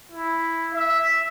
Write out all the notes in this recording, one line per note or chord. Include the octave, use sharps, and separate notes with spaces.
E4
E5